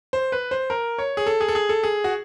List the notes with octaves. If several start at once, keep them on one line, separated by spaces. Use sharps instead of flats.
C5
B4
C5
A#4
C#5
G#4
A4
G#4
A4
G#4
A4
G#4
F#4